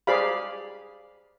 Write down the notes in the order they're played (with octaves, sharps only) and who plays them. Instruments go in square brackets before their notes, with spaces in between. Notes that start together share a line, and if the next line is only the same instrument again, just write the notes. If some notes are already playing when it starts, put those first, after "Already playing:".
[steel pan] G4 G#4 C5 D5 F5 B5